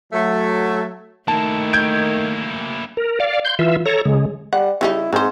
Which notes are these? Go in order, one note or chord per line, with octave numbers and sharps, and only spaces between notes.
F#3 A3
D#3 A3 A#3 E4 A5
G6 G#6 D7
A#4
D5 F5
C6 G6
E3 F4 E5
A4 C#5 A#5
C#3 G#3
G3 F#5
C#3 G3 D#4 E4
G#2 C4 C5